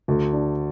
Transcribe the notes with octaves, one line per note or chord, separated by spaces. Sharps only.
D2
D4